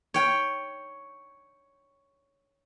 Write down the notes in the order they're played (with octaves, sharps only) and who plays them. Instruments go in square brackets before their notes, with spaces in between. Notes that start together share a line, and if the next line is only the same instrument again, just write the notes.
[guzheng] C#5 G5